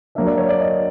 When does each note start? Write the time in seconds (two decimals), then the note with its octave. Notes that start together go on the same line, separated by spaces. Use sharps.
0.15 F#3 A#3 D4 E5
0.27 D5
0.38 C#5
0.49 D5
0.60 D#5